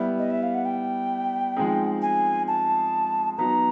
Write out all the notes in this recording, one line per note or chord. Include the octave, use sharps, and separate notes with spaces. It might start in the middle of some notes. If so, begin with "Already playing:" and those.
Already playing: G3 B3 E4
D#5
E5
F5
F#5
G5
F3 G#3 C4 D#4 G#4
G#5
A5
F#3 B3 D#4 A#5